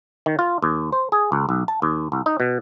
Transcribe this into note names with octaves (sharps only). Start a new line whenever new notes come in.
D#3
F4
D#2
C5
G#4
C#2
B1
A5
D#2
C2
D#4
B2